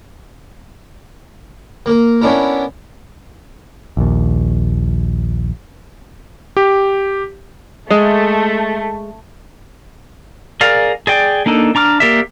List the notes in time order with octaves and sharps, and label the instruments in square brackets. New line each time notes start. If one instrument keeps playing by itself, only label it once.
[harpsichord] A#3 A#4
B3 C#4 D4 E4 A#4
[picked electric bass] A#1 D#2
[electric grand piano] G4
[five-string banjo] G#3 [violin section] A3
[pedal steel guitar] G#4 A#4 D5 F5
G#4 D5 G5
A#3 D4 D#4 A4
D4 A#5 D6 F6
A#3 G4 A#4 D5 E5